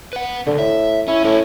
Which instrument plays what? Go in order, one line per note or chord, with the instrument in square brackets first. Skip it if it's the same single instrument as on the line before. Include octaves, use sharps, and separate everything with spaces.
[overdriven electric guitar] B4 F#5
[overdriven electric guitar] D2 B2 [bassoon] D3
[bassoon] A2 [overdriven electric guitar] E5
[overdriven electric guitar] C#4 [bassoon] E4
[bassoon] A2 [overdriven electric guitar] C#4 E4